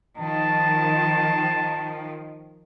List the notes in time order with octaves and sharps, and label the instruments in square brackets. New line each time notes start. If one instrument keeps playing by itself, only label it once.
[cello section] D#3 F3 [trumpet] A5